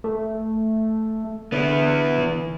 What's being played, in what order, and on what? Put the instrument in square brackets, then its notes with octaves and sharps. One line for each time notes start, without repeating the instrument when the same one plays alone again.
[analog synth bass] A3
[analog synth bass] D3 [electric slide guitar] B3 E4
[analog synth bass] E3